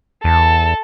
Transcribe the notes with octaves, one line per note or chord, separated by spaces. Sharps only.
E2 A4